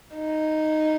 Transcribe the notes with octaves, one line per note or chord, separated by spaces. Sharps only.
D#4